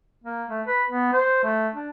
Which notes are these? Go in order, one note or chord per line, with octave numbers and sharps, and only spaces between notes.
A#3
A3
B4
B3
C5
A3
D4